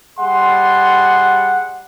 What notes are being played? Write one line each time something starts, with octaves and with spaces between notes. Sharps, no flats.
G3 G#4 F#5 C6